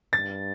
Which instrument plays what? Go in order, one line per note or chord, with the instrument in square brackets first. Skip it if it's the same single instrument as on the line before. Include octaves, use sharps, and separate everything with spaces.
[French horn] G2 [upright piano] A6